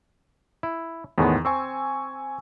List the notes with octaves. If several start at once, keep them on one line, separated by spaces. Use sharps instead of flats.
E4
E2 A2 D#3 G#3 B3
C4 G#5 C#6 E6